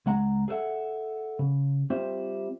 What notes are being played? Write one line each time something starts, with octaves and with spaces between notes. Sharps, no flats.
C#2 G#3 F#5 A#5
G#4 A4 B4 E5 F#5
C#3
G3 C4 F4 C5 E5